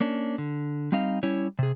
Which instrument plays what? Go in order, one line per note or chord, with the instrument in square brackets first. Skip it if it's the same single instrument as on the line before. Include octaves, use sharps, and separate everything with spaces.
[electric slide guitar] A#3 C#4 D4
D3
G3 C4 D#4 F5
G3 C#4 E4 C#5
C3 G#4